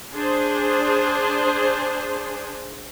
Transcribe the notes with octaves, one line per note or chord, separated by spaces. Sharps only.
D4 G#4 C5